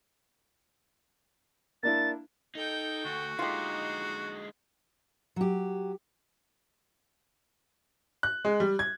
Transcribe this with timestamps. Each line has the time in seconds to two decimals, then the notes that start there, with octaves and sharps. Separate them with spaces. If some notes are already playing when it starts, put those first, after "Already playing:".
1.83 A#3 D4 E4 A6
2.55 D#4 A4 G5
3.05 D2 F#4
3.39 D3 G#3 D#4 F4 G4
5.36 F#3 G4
8.23 F#6
8.45 G#3
8.60 G3
8.79 G#6